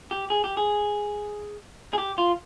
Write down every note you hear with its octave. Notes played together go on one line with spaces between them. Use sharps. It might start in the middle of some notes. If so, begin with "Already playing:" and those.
G4
G#4
G4
G#4
G#4
G4
F4